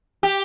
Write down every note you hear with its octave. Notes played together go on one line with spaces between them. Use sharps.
G4